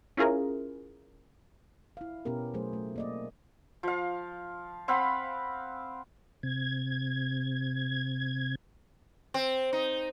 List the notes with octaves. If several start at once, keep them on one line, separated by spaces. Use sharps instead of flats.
C#4 E4 F4 G#4 A#4
E4 F5
B2 B3 C#4 G4 A#4
F#3 A3 G#4 C5
A3
A#3 D5 D#5
F3 F5
C4 F5 F#5 B5
C3 G#6
C4
D#4